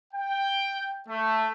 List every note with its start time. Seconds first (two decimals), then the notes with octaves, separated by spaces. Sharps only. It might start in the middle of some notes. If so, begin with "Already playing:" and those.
0.14 G5
1.08 A3